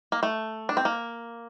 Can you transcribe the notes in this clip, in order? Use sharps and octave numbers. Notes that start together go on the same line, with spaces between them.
A#3
A3
D4
C4
A#3